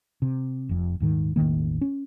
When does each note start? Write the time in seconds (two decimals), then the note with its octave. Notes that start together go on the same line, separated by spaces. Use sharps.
0.22 C3
0.69 F1 F2
1.00 D#1 G#2 D#3
1.36 E1 A1 D#3 A#3
1.81 C#4